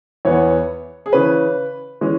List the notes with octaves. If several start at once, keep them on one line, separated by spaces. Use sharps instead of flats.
E2 E3 B3 C#5
G#4
C#3 E3 C#4 B4
E3 G#3 C#4